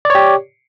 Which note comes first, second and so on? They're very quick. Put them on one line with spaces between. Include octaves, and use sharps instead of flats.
D5 C#5 G4